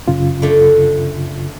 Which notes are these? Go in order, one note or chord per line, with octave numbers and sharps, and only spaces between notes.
F#2 C#3 F4
D3 A3